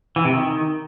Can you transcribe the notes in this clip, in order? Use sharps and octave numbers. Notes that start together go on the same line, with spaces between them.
E3
C3
D#3